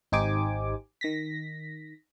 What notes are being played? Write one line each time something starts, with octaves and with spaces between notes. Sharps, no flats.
G#1 D#4 G4 C5 G#5 D6
D#3 A#6 B6